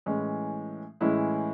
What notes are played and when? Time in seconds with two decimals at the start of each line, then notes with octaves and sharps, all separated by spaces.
0.06 A2 E3 G#3 C#4
1.01 A2 E3 G#3 C#4 E4